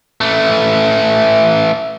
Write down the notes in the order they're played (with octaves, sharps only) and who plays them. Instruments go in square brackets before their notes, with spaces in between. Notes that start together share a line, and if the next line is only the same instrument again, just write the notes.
[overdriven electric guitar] E3 A3